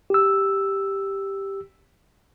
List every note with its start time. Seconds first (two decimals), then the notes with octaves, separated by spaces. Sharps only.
0.10 G4 E6